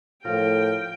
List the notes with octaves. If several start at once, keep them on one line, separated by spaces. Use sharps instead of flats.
A2 F3 A#4 G5